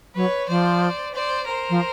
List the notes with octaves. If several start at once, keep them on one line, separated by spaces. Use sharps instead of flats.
F#3 B4 C#5
F3 C5 D5
C5 D5
A#4 C5
F3